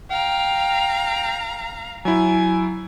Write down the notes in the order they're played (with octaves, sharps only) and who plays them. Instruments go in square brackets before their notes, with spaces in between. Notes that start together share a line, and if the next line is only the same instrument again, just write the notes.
[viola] F5 A#5 [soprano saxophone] G5
[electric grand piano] F#3 E4 [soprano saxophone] G#5